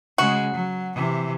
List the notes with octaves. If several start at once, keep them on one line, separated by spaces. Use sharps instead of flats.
C#3 G#3 F#4
F#3
C3 E3